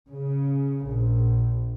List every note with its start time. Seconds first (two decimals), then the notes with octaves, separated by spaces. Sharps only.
0.11 C#3
0.86 A#1